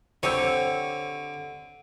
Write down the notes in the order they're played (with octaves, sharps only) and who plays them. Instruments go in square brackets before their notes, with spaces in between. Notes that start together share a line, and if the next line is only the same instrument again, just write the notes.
[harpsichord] D3 [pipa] C4 G4 C#5